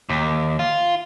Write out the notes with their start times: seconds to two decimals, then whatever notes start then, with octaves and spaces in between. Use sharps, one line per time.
0.09 D#2
0.59 F4